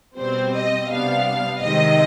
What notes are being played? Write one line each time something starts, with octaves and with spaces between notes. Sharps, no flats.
B2 G3 C4 C5
D#5
C3 G3 B3 D4 F5
C3 D#3 G#3 C4 D#5